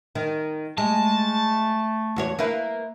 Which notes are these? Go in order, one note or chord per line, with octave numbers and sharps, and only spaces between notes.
D#3
G#3 A3 A5
E2 F#4 C#5
A#3 E4 B4